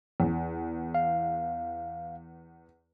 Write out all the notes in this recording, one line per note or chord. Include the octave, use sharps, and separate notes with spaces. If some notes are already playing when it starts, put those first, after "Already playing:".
E2
F5